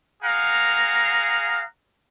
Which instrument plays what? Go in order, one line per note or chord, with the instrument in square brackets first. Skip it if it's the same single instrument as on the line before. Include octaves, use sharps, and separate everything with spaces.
[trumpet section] G#4 F5 F#5 A#5